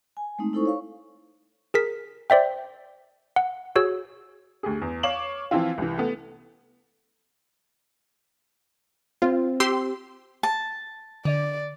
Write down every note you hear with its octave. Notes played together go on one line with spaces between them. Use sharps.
G#5
G#3 A3 C4 D#4
D#4 E4 A4 C5 C#6
C#5 F5 C#6
G#4 A#4 B6
C5 D5 E5 G5
F#5
F#4 G#4 C#5 E6
D2 G4 G#4
E2
C#5 F5 D6 E7 F#7
E3 F3 C4 E4 F4
C2 E3
A3 B3
C4 F4
G4 C6 E6
A5
D3 D5